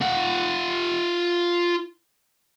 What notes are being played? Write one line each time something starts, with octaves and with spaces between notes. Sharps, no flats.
F4 F#5